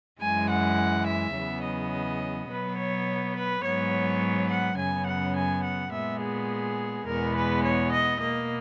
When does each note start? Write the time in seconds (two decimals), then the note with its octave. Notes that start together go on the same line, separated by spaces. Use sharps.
0.21 F#2 E3 G#3 G#5
0.50 F#5
1.07 E5
1.35 E2 C#3 F#3 B3
1.65 D#5
2.50 B2 F#3 B3 B4
2.78 C#5
3.36 B4
3.64 G#2 F#3 B3 C#5
4.50 F#5
4.78 F#2 C#3 F#3 B3 G#5
5.06 F#5
5.36 G#5
5.64 F#5
5.92 A#2 G#3 B3 E5
6.20 G#4
7.06 E2 B2 G#3 B3 A#4
7.35 B4
7.63 C#5
7.91 D#5
8.21 B2 A#3 D#5